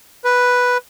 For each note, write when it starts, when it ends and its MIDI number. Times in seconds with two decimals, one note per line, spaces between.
0.24 0.78 71